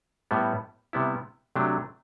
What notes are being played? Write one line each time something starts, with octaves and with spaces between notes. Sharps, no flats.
A2 G3 B3
C3 G3 B3 E4
C3 F#3 A3 D4